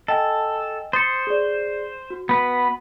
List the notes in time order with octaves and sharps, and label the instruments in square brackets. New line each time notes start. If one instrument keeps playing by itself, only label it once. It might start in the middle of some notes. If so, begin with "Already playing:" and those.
[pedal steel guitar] A4 [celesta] D#5 G5 G#5
[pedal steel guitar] C5 [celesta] D#6 A6 C#7
[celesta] G#4 D5
F#4
[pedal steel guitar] B3 B4